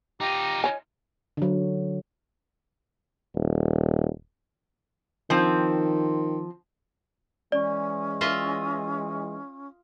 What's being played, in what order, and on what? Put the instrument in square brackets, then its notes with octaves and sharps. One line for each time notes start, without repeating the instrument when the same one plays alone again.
[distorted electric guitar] D#4 F4 [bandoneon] G4 A#5
[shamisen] C#5 G#5
[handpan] D3 F#3
[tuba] D#1
[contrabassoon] D#3 [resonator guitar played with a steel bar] F3 C4
[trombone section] E3 G#3 [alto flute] C#4 [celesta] D5
[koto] F4 D#5 E5